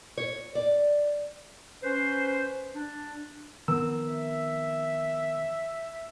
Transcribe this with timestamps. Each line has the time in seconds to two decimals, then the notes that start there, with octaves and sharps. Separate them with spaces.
0.17 C#5
0.55 D5
1.84 C#4 B4 C5
2.75 D4
3.68 D#3 F3 B3 C4 A#4 E6
4.12 E5